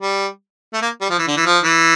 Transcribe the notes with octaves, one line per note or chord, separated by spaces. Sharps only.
G3
A3
A#3
G3
F3
E3
D3
E3
F3
E3